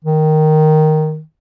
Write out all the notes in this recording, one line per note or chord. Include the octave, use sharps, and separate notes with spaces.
D#3